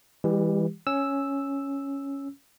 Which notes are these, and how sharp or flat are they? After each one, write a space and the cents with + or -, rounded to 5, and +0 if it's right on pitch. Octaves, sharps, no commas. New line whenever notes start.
E3 -5 G#3 -45 G4 +0
C#4 +0 E6 +0